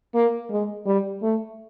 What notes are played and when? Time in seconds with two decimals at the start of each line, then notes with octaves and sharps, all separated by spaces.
0.14 A#3
0.50 G#3
0.86 G3
1.23 A3